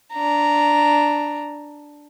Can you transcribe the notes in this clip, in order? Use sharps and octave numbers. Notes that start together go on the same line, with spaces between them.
D4 A#5